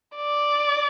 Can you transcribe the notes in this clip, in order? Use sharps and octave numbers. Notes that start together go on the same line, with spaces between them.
D5